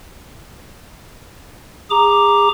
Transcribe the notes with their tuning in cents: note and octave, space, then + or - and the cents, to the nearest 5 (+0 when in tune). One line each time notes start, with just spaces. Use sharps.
G#4 -30 A#5 +0 D6 +0